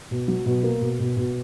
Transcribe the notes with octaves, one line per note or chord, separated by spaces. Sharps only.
B2
F#3
B2
A#3
B2
B2
B2